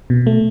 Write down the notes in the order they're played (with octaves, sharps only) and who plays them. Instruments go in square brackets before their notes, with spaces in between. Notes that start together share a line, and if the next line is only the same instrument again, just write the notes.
[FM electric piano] B2
A3